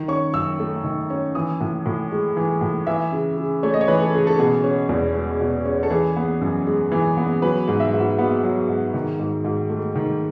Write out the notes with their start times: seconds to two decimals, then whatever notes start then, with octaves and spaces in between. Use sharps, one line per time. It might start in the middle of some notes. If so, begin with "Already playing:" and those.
Already playing: D#3
0.08 C#4 C#6
0.34 F#2 E6
0.59 A3
0.84 D#3
1.10 C#4
1.35 E3 D#6
1.61 A2
1.86 A2
2.11 G#3
2.37 E3
2.61 A2
2.87 E3 E5
3.12 C#3
3.37 C#3
3.63 A3 C#5
3.74 D#5
3.81 C#5
3.88 E3 B4
4.02 A4
4.14 C#3 G#4
4.27 A4
4.39 B2 G#4
4.64 C#4
4.89 E2
5.15 G#3
5.40 B2
5.65 C#4
5.83 A4
5.90 E3 G#4
6.16 B3
6.41 F#2
6.67 G#3
6.92 E3
7.17 B3
7.42 F#3 B4
7.68 G#2
7.80 E5
7.93 G#2
8.00 F#4
8.18 B3 F#4
8.44 F#3
8.68 G#2
8.94 D#3
9.20 G#2
9.45 G#2
9.70 A3
9.95 D#3